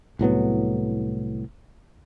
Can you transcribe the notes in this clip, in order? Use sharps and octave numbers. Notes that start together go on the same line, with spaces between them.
C2 A2 F#3 B3